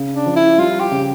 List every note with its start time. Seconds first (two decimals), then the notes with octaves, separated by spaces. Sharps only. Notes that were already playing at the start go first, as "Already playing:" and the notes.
Already playing: C#3
0.14 D4
0.26 F3
0.36 E4
0.58 G3 F4
0.80 G4
0.91 C#3